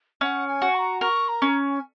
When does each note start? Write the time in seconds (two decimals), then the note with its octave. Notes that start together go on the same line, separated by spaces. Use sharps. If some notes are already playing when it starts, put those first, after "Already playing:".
0.21 C#4 F#5
0.48 G#5
0.62 F#4
0.75 C#6
0.79 A#5
1.01 A#4 C#6
1.29 A#5
1.42 C#4
1.71 G#5